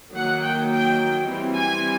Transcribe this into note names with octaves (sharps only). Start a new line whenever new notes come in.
D#3 F#3 A#3 F#5
G5
G5
E3 G3 C4
G#5